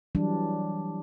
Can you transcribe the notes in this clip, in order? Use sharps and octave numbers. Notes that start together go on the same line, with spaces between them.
E3 F#3 G3 D4